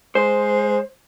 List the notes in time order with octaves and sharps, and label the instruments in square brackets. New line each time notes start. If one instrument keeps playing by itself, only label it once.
[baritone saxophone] G#3 [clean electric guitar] C5